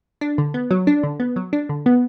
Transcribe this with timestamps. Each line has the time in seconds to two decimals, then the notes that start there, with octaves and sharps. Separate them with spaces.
0.21 D4
0.38 D3
0.54 B3
0.71 F#3
0.87 D4
1.03 D3
1.20 B3
1.36 F#3
1.53 D4
1.69 D3
1.86 B3